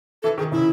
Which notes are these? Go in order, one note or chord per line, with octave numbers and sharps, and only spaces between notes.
E3 A4
D#3 G#4
C#3 E4